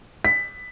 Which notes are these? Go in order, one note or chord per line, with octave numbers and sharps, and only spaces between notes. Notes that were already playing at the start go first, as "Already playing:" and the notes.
B6